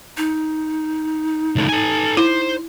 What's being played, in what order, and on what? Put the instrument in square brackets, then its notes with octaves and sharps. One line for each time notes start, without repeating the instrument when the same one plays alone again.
[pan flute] D#4
[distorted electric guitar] C#2 A2
A4 G#5
[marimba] E4 [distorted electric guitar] C5